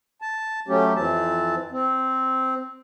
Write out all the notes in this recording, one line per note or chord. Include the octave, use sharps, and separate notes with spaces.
A5
F#3 A3 C#4 G4
F2 E3 C4 A5
C4